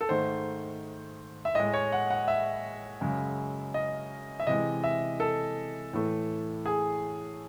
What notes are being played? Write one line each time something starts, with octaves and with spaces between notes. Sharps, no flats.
A4
G#2 D#3 A3 C5
E5
A2 G#3 D#5
C#5
F#5
F#5
E5
F#2 C#3 G#3
D#5
E5
C3 E3 G#3 D#5
E5
A4
A2 E3 A3
G#4